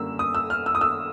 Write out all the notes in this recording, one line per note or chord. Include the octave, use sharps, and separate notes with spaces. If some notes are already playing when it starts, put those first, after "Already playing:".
Already playing: F#2 D3 G3 A#3 E6
D#6
E6
F6
E6
D#6
E6